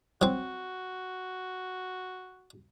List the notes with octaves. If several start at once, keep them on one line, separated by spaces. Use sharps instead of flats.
F#3 C4 F#4